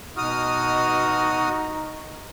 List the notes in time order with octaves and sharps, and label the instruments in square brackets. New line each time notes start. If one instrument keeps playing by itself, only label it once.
[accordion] B2 D#6 F6 [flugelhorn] D#4 [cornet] F#4